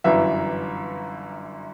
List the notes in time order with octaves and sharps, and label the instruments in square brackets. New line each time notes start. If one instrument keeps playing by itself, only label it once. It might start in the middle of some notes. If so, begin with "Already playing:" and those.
[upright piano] G1 F#2 E3 E5